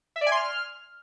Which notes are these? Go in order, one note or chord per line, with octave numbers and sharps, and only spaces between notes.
E5
D5
G#5
C6
F6